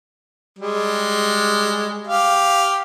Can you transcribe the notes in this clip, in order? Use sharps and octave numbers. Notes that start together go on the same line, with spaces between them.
G3 G#3
G4 F5